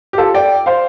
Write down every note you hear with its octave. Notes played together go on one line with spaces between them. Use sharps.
G4
F4 A4
D5 G5
C5 F5